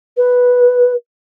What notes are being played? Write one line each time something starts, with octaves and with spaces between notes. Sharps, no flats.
B4